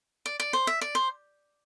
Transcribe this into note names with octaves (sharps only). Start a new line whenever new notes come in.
D5
D5
C5
E5
D5
C5